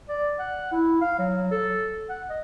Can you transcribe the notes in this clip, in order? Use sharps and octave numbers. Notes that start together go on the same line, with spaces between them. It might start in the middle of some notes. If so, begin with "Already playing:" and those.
D5
F#5
E4
F5
F#3
A4
F#5
D#5